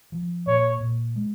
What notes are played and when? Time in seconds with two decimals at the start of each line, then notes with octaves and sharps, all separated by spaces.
0.12 F3
0.47 A#2 C#5
0.80 A#2
1.16 G#3